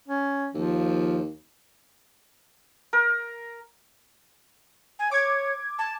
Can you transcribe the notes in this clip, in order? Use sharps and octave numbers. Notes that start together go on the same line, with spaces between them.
C#4
D#2 F3
A#4
G#5
C#5 D6 G#6
A5